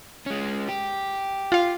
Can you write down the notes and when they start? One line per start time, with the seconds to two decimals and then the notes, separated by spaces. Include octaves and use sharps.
0.26 G#3 C#4
0.69 G4
1.52 F4 F5